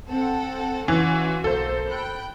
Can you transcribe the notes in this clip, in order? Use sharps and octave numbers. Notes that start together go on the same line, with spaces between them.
C4 A4 F#5
E3 C#4 F4 F#4
B1 A#3 A4 C5
G5 B5 F#6